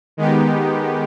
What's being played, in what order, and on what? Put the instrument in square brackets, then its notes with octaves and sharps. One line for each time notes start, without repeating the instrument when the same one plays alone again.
[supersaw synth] D#3 G#3 B3 D#4 G4